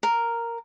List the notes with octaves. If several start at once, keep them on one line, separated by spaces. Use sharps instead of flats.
A#4